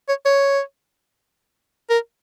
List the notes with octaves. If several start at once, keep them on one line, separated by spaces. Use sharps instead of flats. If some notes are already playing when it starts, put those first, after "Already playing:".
C#5
C#5
A#4